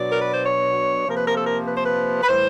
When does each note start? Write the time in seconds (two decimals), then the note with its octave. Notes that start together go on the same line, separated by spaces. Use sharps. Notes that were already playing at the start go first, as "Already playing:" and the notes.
Already playing: B2 F#3 B3 D4 D5
0.10 A#4
0.21 B4
0.32 C5
0.44 C#5
1.05 C3 F3 A#3 A#4
1.15 B4
1.26 A#4
1.36 A4
1.46 A#4
1.66 B4
1.76 C5
1.84 B4
2.23 B4
2.28 A2 E3 G3 C5